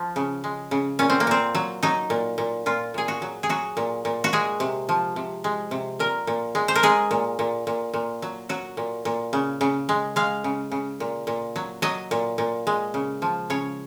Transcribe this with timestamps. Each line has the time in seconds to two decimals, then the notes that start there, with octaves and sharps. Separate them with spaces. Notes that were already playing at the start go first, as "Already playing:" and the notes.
Already playing: F3
0.16 C#3
0.44 G#3
0.71 C#3
0.99 A#2 C#4
1.10 C4
1.20 A#3
1.27 A#2 C4
1.55 F#3
1.83 F#3 D#4
2.10 A#2
2.38 A#2
2.66 A#2 F4
2.94 A#2 G#4
3.08 F#4
3.22 F#3
3.43 G#4
3.49 F#3 F#4
3.77 A#2
4.05 A#2
4.24 F#4
4.33 G#3 G#4
4.60 C3
4.89 F3
5.16 C3
5.44 G#3
5.71 C3
5.99 A#2 A#4
6.27 A#2
6.55 G#3
6.68 C5
6.75 A#4
6.83 G#3 G#4
7.11 A#2
7.39 A#2
7.67 A#2
7.94 A#2
8.22 F#3
8.49 F#3 F#4
8.77 A#2
9.05 A#2
9.33 C#3
9.61 C#3
9.89 G#3
10.16 G#3 F5
10.44 C#3
10.72 C#3
11.00 A#2
11.27 A#2
11.56 F#3
11.82 F#3 D#5
12.11 A#2
12.38 A#2
12.67 G#3
12.94 C#3
13.22 F3
13.50 C#3 C#5